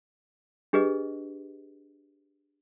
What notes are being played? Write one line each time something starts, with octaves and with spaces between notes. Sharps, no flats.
D4 G4 G#4 B4 D#5